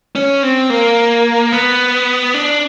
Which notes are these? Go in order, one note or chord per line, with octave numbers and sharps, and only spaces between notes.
C#4
C4
A#3
B3
D4